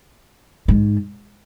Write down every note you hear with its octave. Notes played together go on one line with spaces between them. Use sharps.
G#2